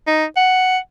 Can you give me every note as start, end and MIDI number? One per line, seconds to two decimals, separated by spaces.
0.07 0.26 63
0.37 0.78 78